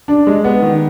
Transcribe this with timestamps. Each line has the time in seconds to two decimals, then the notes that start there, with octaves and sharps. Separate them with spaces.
0.08 D4
0.27 G#3
0.44 B3
0.62 D#3